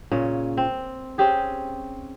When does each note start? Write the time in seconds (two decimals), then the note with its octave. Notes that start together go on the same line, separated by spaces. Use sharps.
0.12 A#2 C#3 C#4
0.57 C4
1.18 C4 C#4 G4 G#4